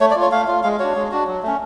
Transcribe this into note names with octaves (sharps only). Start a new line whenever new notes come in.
A3 C#5
D5
F4
C#5
A3 F5
F4
G#3 F5
D4 F#4 C#5
G#3
D4 F#4
F#3
A3 C#4